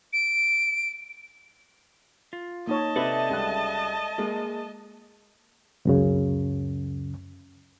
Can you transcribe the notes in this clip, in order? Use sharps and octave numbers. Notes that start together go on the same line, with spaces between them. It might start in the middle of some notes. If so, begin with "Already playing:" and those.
D7
F4
A#3 D#4 C#5 D#5 A5
C3 A4 B4 D5 E5
C#2 G3 F#6
G#3 A#3
C#2 F#2 C#3